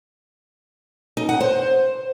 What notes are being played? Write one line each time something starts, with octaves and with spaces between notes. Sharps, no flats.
D#4
F#5
C5